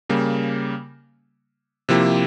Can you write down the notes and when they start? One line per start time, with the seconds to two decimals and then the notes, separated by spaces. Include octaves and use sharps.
0.09 C#3 G3 A#3
1.89 C3 F3 A#3 E4 G4